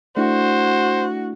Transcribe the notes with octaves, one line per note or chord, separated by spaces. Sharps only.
A3 D4 E4 F#4 C5